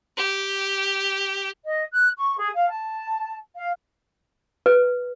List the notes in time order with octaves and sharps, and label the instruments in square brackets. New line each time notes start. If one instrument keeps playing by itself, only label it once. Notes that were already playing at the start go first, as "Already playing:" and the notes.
[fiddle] G4
[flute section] D#5
F#6
C#6
G#4
F5
A5
F5
[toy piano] B4